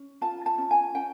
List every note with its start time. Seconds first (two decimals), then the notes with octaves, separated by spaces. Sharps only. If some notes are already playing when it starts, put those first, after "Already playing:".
Already playing: C#4
0.21 F4 A5
0.46 A5
0.58 C#4
0.71 G#5
0.95 C#4 G5